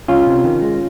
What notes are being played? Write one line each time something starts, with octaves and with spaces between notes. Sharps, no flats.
C#2 C#4 F4
C3
D#3
G#3